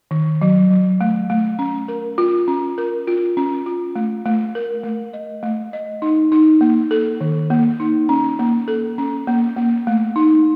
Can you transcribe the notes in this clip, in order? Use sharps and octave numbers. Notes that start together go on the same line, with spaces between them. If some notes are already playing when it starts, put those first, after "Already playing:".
D#3
F#3
F#3
A3
A3
C#4
A#4
F4
C#4
A#4
F4
C#4
F4
A3
A3
A#4
A3
D#5
A3
D#5
D#4
D#4
A#3
A4
D#3
A#3
D#4
C#4
A#3
A4
C#4
A#3
A#3
A3
D#4